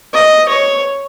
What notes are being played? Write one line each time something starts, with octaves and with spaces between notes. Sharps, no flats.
D#5
C#5